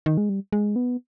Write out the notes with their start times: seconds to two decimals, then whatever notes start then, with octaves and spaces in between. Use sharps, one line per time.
0.06 D#3
0.18 G#3
0.29 G3
0.53 G#3
0.76 B3